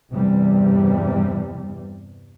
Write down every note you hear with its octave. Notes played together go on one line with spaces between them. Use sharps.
E2 G2 C3 G3